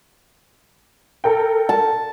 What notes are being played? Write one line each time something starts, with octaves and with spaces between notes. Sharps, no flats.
A4 A#4 G5
A5